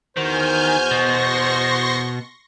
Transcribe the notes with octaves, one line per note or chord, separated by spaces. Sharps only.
E2 D#3 F#4 C5 G#5 F6 G6
B2 C6 C#6 A#6